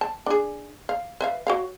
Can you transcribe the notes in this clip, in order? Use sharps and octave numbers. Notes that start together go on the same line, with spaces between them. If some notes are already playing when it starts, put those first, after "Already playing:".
A5
D4 G#4
F5
B4 E5 F5
F#4 C#5 F5